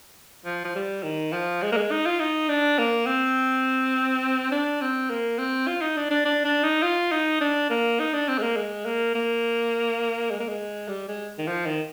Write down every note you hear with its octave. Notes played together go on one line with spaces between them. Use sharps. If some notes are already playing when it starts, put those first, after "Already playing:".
F3
F3
G3
D#3
F3
G#3
A#3
G#3
D#4
F4
D#4
D4
A#3
C4
D4
C4
A#3
C4
F4
D#4
D4
D4
D4
D4
D#4
F4
D#4
D4
A#3
D#4
D4
C4
G#3
A#3
G#3
A#3
A#3
G#3
A#3
G#3
G3
G#3
D#3
F3
D#3